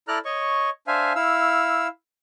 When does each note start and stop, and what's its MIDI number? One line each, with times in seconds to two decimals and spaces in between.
0.08 0.18 64
0.08 0.18 69
0.08 0.18 74
0.08 0.18 82
0.08 0.18 89
0.08 0.18 90
0.25 0.70 73
0.25 0.70 75
0.25 0.70 85
0.87 1.13 62
0.87 1.13 72
0.87 1.13 76
0.87 1.13 77
0.87 1.13 80
1.15 1.87 64
1.15 1.87 77
1.15 1.87 88